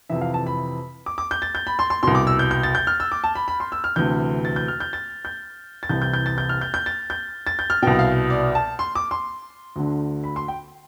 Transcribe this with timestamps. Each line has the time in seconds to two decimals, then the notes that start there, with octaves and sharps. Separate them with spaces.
0.09 F2 C3 E3 E5
0.21 F5
0.34 A5
0.47 B5
1.06 D6
1.18 D6
1.31 G6
1.42 A6
1.55 G6
1.67 B5
1.79 C6
1.90 C6
2.03 C2 B2 C6
2.15 D6
2.27 E6
2.39 G6
2.51 G6
2.63 A6
2.75 G6
2.87 F6
3.00 E6
3.12 D6
3.24 A5
3.35 B5
3.48 B5
3.60 C6
3.72 E6
3.84 F6
3.96 D2 C3 E3 G6
4.45 A6
4.56 G6
4.68 F6
4.80 G6
4.93 A6
5.25 G6
5.83 A6
5.89 C2 C3 E3 G6
6.02 G6
6.14 G6
6.26 A6
6.38 G6
6.49 F6
6.61 G6
6.74 G6
6.86 A6
7.10 G6
7.47 A6
7.59 G6
7.70 F6
7.82 C2 B2 G5
7.99 F5
8.30 D5
8.55 A5
8.79 C6
8.95 D6
9.11 C6
9.76 D2 D3
10.24 B5
10.36 C6
10.48 G5